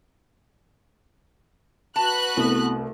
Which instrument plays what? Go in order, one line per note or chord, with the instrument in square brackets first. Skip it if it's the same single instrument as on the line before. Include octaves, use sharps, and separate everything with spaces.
[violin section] F#4 B4 F#6 [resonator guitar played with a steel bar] A5
[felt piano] C2 A3 [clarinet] B3